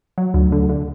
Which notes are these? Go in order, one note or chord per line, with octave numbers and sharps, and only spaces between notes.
F#3
D2
D3
D3